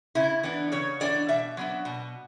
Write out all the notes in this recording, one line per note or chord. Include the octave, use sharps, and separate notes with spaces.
C#3 E4
E3 B3 D4
C#3 C#5
E3 B3 D4 D5
B2 E5
F#3 B3 D4
B2